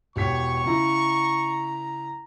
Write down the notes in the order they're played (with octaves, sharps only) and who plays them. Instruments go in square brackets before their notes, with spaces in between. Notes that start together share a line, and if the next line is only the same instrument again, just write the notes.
[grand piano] E1 G4 B6 [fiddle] C#5 [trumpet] C#6
[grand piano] C#3 E4 [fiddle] A#5